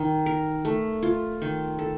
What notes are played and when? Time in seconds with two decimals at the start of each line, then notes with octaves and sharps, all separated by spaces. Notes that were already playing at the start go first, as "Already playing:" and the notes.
Already playing: D#3 D#4
0.26 A#4
0.65 A3
1.02 F4
1.42 D#3
1.79 A4